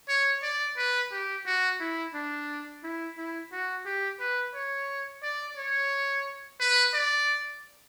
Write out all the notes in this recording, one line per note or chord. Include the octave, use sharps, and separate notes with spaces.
C#5
D5
B4
G4
F#4
E4
D4
E4
E4
F#4
G4
B4
C#5
D5
C#5
B4
D5